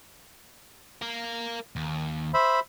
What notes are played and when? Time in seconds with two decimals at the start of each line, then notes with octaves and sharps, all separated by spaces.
1.02 A#4 F5
1.76 D#2
2.34 C5 E5 B5